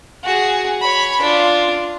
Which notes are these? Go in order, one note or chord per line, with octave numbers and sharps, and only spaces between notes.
F#4 G#4
C#5 B5
D4 F4